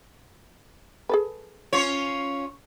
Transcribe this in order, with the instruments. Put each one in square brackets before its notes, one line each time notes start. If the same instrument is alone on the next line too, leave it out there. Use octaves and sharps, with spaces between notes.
[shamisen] G#4 A4 B4
[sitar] C#4 F4 C#5